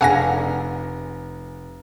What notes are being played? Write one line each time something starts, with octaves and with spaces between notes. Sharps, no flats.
F1 D4 G#4 F5 F#5 G#5 A#6